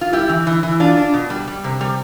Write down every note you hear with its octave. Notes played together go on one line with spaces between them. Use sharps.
F4
G3 E4 G4
E3
E3
E3
D4 F4
D4
B2
G3
G3
C3
G3